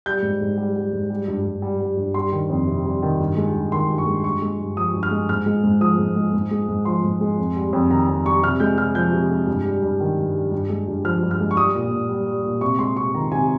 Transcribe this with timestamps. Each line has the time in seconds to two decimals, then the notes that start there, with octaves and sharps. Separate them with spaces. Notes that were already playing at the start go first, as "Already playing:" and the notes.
0.06 G3 G6
0.23 G#2
0.41 G#2
0.58 G3
0.76 G3
0.93 G#2
1.10 G3
1.28 G2
1.45 G2
1.62 G3
1.80 G3
1.97 G2
2.14 G3 C6
2.32 D#3
2.50 F2
2.67 C3
2.85 G3
3.02 D#3
3.20 G2
3.37 G#3
3.54 G2
3.72 D#3 C6
3.89 G2
3.98 C#6
4.07 G#3
4.24 G2 C#6
4.42 G#3
4.60 G2
4.77 F3 D#6
4.94 G2
5.03 F6
5.11 G#3
5.29 G#2 F6
5.46 G#3
5.64 G#2
5.81 F3 D#6
5.99 G#2
6.16 G#3
6.33 G#2
6.51 G#3
6.69 G#2
6.85 F3 C6
7.04 G#2
7.21 G#3
7.38 F2
7.56 G3
7.73 F2
7.90 D#3 A#5
8.09 F2
8.25 G3 C#6
8.43 C3 F6
8.60 G#3 G6
8.78 C3 F6
8.95 F3 G6
9.12 C3
9.30 G#3
9.47 G2
9.65 G3
9.82 G2
10.00 D#3
10.18 G2
10.35 G3
10.52 G2
10.69 G#3
10.88 G2
11.05 F3 F6
11.23 G2
11.31 F6
11.40 G#3
11.51 C#6
11.57 G3 D#6
11.75 A#2
11.91 A#2
12.09 G3
12.27 G3
12.45 A#2
12.61 C3 C#6
12.78 G#3 C6
12.97 C3 C#6
13.14 D#3 A#5
13.32 C3 G#5